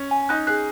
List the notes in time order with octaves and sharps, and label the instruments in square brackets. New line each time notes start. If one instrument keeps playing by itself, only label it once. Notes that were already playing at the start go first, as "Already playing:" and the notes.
Already playing: [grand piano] C#4
[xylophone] G#5
[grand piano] D#4 [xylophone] F#6
[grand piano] G#4 [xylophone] F#6